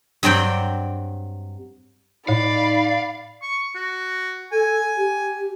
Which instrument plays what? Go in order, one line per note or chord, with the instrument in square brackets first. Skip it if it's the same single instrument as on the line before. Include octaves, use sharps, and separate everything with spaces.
[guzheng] G2 F#3 C4 D5 G5
[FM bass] A2 [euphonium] D#4 [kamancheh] D5 B5 [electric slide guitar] F5
[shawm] C#6
F#4
[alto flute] A4 [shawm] G#5
[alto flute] G4